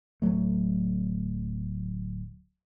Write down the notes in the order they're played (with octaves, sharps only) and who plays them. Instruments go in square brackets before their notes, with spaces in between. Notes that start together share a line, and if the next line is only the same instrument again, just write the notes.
[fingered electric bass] D1 D#2 F#3 A3